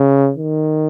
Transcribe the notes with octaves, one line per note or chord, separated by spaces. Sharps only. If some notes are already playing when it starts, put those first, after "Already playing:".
Already playing: C#3
D#3